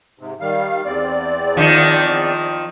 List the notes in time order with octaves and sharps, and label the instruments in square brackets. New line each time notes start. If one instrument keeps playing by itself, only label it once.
[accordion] G#2 C3
D#3 G3 F5
E2 C4 D5
[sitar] D#3 F3